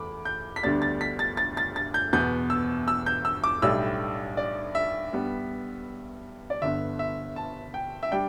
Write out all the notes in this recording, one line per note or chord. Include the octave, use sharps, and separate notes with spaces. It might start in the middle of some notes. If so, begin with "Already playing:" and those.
Already playing: E2 A3 B5 D6
G6
B6
D2 D3 G3 B3 D4 A6
A6
B6
A6
A6
A6
A6
G6
E2 B2 B3 G6
E6
E6
G6
E6
D6
B1 A2 G3 D4 E6
D5
E5
G2 G3 B3
D5
G1 G2 D3 B3 E5
E5
A5
G5
E5
G3 D4 G5